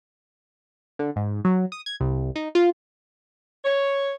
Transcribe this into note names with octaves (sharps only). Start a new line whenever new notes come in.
D3
G#2
F#3
D#6
G#6
C2
D#4
F4
C#5